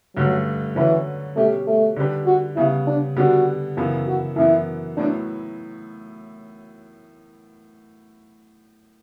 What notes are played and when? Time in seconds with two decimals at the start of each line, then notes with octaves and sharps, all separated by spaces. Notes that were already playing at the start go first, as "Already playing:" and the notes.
0.16 G2 D3 F#3 A3
0.76 D3 E3 F#3 C#4 F#4 B4
1.36 B2 G3 A3 C#4 G4
1.67 A3
1.96 D3 G3 D4 G4 B4
2.26 F#4
2.56 C#3 G3 B3 E4
2.87 D4
3.16 D3 G3 B3 D4 F#4
3.77 F#2 C#3 E3 B3 E4
4.07 F#4
4.36 F#2 E3 B3 E4
4.97 A2 F#3 B3 D4 E4